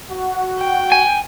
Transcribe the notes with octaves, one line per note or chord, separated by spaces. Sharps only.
F#4
G5
G#5